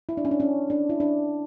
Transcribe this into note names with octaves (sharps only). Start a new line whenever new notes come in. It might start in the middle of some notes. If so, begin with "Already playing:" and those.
E4
D4
C#4
D4
C#4
D4
E4
D4